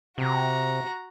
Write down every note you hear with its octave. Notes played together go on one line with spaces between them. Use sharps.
C3 F#4 A#5